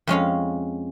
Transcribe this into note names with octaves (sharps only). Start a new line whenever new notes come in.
F2 G#3 C#4 F5